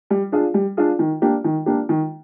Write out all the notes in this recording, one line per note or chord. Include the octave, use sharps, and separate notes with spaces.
G3
D4 F4 G#4
G3
D4 F4 G#4
D#3
A#3 D4 G4
D#3
A#3 D4 G4
D#3